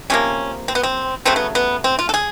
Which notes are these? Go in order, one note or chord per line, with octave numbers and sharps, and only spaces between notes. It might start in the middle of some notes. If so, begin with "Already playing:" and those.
C3 F3 A#3 C#4
C4
B3
C4
C#3 F#3 A3 C4
B3
B3
C4
F4
A4
G#4